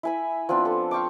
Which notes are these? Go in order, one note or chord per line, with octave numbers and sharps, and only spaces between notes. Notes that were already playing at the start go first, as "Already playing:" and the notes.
E4 G#5 B5
F3 B3 C4 D4
A4
F5 G5 C#6 D6